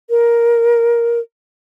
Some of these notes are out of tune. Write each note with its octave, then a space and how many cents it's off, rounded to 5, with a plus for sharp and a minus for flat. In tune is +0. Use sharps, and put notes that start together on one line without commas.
A#4 +10